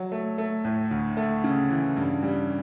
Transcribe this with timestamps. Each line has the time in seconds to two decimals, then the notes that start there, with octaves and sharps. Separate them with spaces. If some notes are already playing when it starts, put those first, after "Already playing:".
Already playing: F#3
0.12 A3
0.38 A3
0.65 A2
0.91 D2
1.17 A3
1.44 C#3
1.70 E3
1.97 G2
2.23 G3